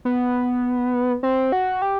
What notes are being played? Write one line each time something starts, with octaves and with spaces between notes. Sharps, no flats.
B3
C4
F#4
G4